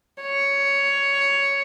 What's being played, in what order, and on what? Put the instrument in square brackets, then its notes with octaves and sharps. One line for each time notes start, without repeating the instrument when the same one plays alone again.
[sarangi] C#5